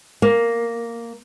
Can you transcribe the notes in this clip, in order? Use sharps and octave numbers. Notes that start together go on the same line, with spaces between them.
A#3